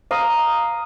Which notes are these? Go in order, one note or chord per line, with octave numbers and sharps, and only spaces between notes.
F5 A#5 D#6